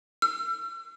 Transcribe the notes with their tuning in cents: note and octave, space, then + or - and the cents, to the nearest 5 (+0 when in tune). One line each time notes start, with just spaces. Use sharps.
E6 +45